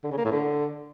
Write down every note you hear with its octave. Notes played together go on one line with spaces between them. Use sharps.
D3
C#3
A#3
A2
D3